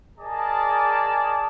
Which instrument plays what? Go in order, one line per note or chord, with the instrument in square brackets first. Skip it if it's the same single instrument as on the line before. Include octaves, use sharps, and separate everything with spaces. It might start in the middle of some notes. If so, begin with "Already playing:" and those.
[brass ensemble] G#4 A#4 D5 D#5 A5